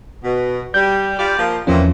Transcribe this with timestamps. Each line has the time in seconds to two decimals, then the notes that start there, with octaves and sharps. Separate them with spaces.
0.24 B2
0.74 G3 G6
1.19 G3 F4 D5
1.38 F3 A#3
1.67 E2 A#2 E3 F3 C4 C#4